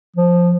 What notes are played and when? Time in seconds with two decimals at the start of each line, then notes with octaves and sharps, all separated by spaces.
0.16 F3